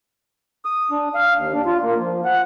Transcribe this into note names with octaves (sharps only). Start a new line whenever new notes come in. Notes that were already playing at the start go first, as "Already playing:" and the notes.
D#6
D4
F5
D#2
D4
F4
A#3
F3
F#5